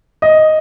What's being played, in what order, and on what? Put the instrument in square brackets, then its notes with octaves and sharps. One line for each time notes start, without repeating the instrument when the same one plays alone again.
[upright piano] D#5